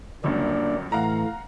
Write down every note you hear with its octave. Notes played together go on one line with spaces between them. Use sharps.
G1 C#2 F#2 A#3 D4 D5
A2 E3 A3 F5 F#5 A#5